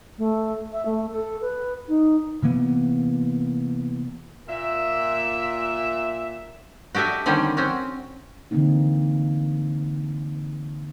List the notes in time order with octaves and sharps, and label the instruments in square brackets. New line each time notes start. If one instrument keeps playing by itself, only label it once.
[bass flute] A3
E5
A3
A4
B4
D#4
[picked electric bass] C3 E3 A#3 B3
[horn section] A#2 E5
[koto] F#4 G4 A4 D#5 E5
D3 D#3 G3 C4 C#4
C4 C#4 F#4
[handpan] D3 E3 A#3 C4 D#4